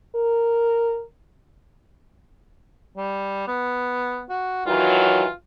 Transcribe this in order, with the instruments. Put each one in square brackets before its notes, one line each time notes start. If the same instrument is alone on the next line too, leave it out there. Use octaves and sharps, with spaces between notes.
[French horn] A#4
[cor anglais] G3
B3
F#4
[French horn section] D#3 E3 F#3 [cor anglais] F4